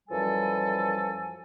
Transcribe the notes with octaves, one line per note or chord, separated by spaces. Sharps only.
F#2 E3 F3 G3 A4 G#5